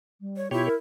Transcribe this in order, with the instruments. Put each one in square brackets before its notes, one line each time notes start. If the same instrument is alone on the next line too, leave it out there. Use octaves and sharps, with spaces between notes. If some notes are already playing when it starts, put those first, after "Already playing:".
[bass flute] G3
[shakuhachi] C#5
[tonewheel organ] B2 G4 C#5 [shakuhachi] E4 [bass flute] F4
[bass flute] A#4